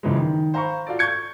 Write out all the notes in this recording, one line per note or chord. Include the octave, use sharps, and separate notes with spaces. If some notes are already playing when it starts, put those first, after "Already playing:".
F#2 C#3 E3 F3 G#3
D#3
C5 F5 A#5 B5 C#6
F4 F#4 A4 D5
C#6 G6 G#6 C#7